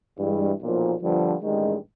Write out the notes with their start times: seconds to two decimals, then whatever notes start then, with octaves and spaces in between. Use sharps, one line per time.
0.18 G2 E3 G#3
0.60 B1 A#2 F3
1.01 G1 G2 D3 F3
1.42 A1 G2 D#3 G#3